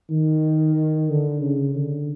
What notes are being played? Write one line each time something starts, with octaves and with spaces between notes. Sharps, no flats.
D#3
D3
C#3
D3